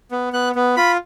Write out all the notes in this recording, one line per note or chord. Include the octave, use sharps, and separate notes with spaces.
B3
B3 F#6
B3
F4 B5